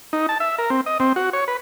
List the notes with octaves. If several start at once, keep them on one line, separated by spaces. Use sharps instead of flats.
D#4
A5
E5
A#4
C4
D#5
C4
F#4
C#5
B4